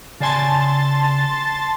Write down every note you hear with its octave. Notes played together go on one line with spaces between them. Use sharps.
C#3 D5 G#5 A5 C6 A6